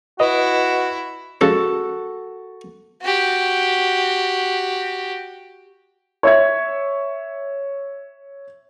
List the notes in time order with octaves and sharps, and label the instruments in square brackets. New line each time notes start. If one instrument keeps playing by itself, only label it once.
[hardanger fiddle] E4 [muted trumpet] F#4 [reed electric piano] B4 D#5
[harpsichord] F3 G#3 C#4 [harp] F#4 A4
[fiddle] F#4 G4
[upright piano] C#5 E5 G#6